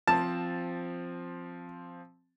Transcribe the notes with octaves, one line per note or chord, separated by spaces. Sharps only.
F3 C4 A5